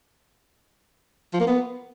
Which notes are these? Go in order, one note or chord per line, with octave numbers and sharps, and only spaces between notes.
F3
A#3
B3